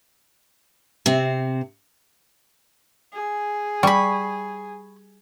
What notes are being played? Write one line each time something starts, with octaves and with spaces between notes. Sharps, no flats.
C3 C4
G#4
G3 B5 C#6